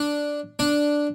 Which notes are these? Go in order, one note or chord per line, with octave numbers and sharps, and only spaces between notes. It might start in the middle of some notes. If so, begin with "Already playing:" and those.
Already playing: D4
D4